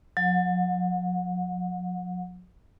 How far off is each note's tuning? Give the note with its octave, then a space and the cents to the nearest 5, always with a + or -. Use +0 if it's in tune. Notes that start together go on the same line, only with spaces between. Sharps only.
F#3 -45 F#5 -25